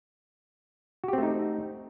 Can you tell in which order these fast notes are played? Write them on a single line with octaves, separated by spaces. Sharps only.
F#4 G4 C4 A3 D#4